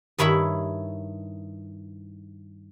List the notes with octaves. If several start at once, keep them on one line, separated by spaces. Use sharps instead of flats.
G2 D#3 E4 C#5 E5 B5